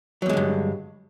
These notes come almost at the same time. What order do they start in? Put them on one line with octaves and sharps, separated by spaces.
F#3 E2 G#3 D3 G2